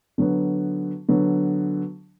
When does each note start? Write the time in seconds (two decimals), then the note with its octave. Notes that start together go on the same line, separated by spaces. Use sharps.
0.18 D3 F#3 B3
1.09 D3 F#3 B3